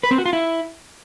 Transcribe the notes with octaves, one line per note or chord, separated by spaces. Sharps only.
B4
C4
F#4
F4
E4